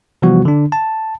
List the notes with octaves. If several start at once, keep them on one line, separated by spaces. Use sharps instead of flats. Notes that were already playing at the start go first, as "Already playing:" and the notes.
C3 E3 F3 G3 B3 F#4
D3 D4
A5